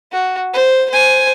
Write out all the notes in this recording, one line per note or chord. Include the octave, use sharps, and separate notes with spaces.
F#4
C5
C5 G#5